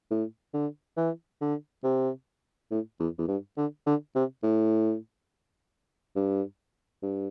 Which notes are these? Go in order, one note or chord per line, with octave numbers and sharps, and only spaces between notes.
A2
D3
E3
D3
C3
A2
E2
E2
G2
D3
D3
C3
A2
G2
G2